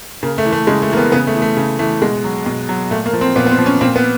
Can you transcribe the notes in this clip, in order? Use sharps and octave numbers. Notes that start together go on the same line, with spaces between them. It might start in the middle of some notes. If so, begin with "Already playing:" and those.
C#3 A#3
A3
E3
A3
C#3 G#3
A3
E3 A#3
B3
C#3 B3
A3
E3
A3
C#3
E3 A3
B2 G#3
F#3
B2
F#3
A#2 A3
A#3
F3
C4
A#2 B3
B3
C4
F3
C#4
A#2 C4
B3